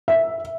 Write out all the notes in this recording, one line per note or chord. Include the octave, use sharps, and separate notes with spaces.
E5